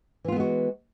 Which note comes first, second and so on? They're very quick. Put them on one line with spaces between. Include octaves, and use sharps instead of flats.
E3 F4 B3 G#3 F#4